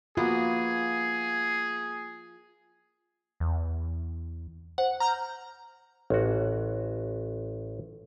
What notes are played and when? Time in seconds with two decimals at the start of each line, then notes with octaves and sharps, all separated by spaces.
0.17 A#3 B3 F4 F#4 G#4
3.40 E2
4.78 C5 F#5
5.00 A#5 F6 G6
6.10 A1 F#4